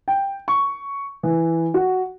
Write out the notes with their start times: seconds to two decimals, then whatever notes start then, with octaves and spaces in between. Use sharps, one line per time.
0.08 G5
0.48 C#6
1.23 E3
1.74 F#4